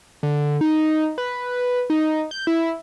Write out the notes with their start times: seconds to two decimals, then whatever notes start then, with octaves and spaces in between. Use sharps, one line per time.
0.23 D3
0.61 D#4
1.18 B4
1.90 D#4
2.31 G6
2.47 E4